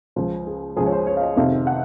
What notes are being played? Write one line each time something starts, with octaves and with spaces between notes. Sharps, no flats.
C#2 C#3 F3 G#4
G#4
C#2 C#3 F3 G#4
C#5
C5
C#5
F5
D#5
F1 F2 C3 D#3 F5
F#5